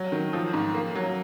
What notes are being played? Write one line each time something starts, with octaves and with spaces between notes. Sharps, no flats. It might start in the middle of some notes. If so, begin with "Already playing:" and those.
Already playing: F#3
D#3
F3
G#2
A#3
F#3